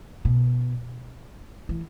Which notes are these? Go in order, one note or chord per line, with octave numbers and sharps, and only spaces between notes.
B2
E3